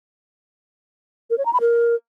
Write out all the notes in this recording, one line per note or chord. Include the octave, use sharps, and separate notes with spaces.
A#4
C#5
A#5
B5
A#4